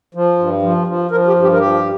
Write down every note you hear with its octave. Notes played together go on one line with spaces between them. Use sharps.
F3
G2
F3
F3
F3 A#4
G4
G2
G4
A#4
F3 G4